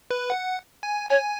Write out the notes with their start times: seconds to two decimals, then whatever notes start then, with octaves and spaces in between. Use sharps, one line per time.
0.11 B4
0.30 F#5
0.83 G#5
1.10 C#5 G#5